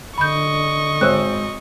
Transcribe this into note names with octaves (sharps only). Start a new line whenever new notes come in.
D3 D#5 B5 C#6 G6
G#1 C5 C#5 E6 F#6